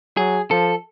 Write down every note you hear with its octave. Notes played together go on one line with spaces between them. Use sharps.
F#3 G#4
F3 A4